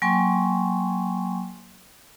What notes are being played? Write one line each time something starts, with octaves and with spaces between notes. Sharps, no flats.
F#3 A#3 G5 G#5 C6 C#6